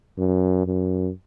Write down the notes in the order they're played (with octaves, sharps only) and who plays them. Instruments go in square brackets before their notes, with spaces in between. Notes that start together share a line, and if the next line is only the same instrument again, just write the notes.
[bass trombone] F#2
F#2